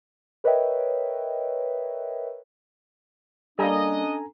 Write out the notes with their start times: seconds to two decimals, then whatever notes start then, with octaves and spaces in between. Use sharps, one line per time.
0.44 A#4 B4 C#5 D#5 E5 G5
3.59 G3 A#3 C#4 D4 A4 D#5 G#5 A#5